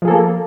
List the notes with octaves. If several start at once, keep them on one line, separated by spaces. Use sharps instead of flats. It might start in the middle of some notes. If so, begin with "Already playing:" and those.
F3 A#3 G#4 A4